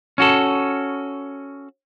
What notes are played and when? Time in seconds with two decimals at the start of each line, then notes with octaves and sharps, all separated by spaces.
0.18 C#4 F#4 A4